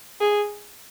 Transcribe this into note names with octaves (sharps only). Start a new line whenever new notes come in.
G#4